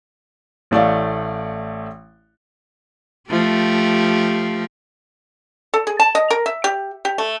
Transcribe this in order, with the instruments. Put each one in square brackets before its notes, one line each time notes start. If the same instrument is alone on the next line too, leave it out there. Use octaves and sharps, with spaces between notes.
[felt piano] A1 A3 D5 F5
[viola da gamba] F3 A3 G4
[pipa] A4
G#4
A5
D#5
A#4
E5
G4
G4
A3